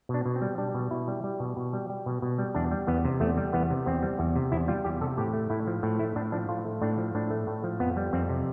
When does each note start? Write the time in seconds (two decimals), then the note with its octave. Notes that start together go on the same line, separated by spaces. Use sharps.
0.09 B2 D4
0.26 B2
0.36 C4
0.42 G3
0.58 G3 D4
0.74 B2
0.91 B2 E4
1.08 G3
1.24 G3
1.40 B2
1.57 B2
1.73 G3
1.90 G3
2.06 B2
2.22 B2
2.38 G3
2.55 E2 D4
2.71 G3
2.87 E2 B3
3.05 C3
3.20 E2 A3
3.37 G3
3.53 E2 B3
3.70 C3
3.86 E2 C4
4.03 G3
4.19 E2
4.36 C3
4.52 E2 E4
4.68 G3 F4
4.84 E2 G4
5.01 C3 A4
5.17 A2 G4
5.33 A3
5.50 A2 E4
5.67 F3
5.83 A2
5.99 A3 E4
6.16 A2 D4
6.32 F3 D4
6.49 A2 F4
6.65 A3
6.82 A2 D4
6.98 F3
7.15 A2 D4
7.31 A3
7.47 A2
7.64 F3
7.80 F2 B3
7.97 G3
8.13 F2 C4
8.29 C3